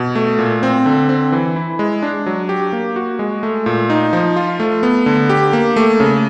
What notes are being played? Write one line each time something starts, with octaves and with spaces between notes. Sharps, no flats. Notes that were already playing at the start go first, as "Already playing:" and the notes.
Already playing: B2
A3
A#2
C4
D3
C4
E3
E4
G#3
D4
F#3
G4
A#3
F#4
G#3
A3
A#2
D#4
F3
F4
A3
B3
D3
G4
A#3
A3
C#3